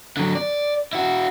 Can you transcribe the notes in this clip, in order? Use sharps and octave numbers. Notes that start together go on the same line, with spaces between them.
D3 F#3
D5
E4 F#4